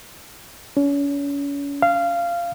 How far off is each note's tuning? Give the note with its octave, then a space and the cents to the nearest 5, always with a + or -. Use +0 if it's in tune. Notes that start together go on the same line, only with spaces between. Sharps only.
C#4 +35
F5 -15